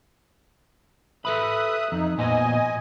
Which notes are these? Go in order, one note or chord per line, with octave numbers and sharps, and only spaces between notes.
A4 B4 E5 B5 D#6 F#6
F2 D#4
A#2 B3 C5 D#5 G#5